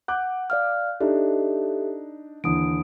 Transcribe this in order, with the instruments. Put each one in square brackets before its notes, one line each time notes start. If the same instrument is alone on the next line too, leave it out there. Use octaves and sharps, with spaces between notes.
[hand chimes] F#5 [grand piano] D6 F#6 G6
[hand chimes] D5 F5 F6
[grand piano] D4 D#4 [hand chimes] G4 A4 E5
[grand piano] D#2 D3 E3 [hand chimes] D#6 D7